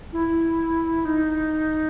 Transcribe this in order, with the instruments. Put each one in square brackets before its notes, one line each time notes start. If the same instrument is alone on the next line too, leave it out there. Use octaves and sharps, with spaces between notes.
[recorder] E4
D#4